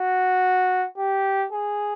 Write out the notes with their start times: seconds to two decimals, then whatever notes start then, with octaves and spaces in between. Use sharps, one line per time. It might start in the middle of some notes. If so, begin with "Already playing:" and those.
Already playing: F#4
0.98 G4
1.52 G#4